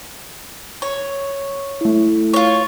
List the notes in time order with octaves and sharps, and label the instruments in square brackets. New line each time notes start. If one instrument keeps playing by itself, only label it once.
[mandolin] C#5
[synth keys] A3 E4
[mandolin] F4 C#5